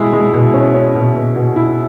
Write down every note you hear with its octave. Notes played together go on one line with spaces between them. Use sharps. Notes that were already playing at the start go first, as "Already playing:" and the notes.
Already playing: B2 G#3 E4
G#3
B2
C#4
C#4
B2
B2
B2
E4